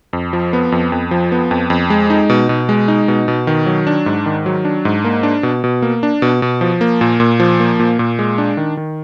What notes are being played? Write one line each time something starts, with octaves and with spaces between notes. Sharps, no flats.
F2
F3
B3
F2
F2
F3
B3
F2
F2
G#3
D#4
B2
B2
G#3
D#4
B2
B2
D#3
F#3
D4
G#2
D#3
F#3
D4
G#2
A#3
D4
B2
B2
A#3
D4
B2
B2
F3
A#3
A#2
A#2
F3
A#3
A#2
A#2
G#3
D4
D#3
D#3